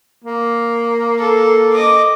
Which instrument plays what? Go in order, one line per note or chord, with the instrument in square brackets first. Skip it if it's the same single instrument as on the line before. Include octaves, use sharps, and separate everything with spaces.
[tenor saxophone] A#3
[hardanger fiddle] A4
D#5 D6